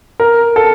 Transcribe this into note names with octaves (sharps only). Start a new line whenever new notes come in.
A#4
A4